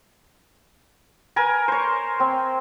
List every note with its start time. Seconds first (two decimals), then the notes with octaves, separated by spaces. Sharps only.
1.36 A#4 B4 G#5
1.68 C5 C#5
2.20 C4